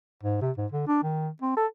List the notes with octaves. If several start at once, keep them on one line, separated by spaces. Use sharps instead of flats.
G#2
C3
G#2
D3
D4
D#3
C4
A4